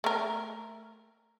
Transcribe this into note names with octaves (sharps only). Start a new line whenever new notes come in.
A3 A#4